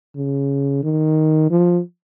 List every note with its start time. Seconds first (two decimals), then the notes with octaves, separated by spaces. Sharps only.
0.16 C#3
0.83 D#3
1.51 F3